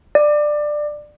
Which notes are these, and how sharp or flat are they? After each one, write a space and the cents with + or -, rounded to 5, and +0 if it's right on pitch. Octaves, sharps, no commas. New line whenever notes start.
D5 +15